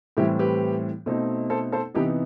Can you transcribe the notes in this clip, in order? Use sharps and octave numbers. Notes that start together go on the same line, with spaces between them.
A2 E3 G3 C4 E4 G4
G4 B4
B2 A3 C4 D#4
A4 C5
A4 C5
C3 E3 B3 D#4 G4 B4